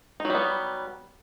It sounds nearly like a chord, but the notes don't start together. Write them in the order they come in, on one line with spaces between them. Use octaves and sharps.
D#4 F#3 G3 B3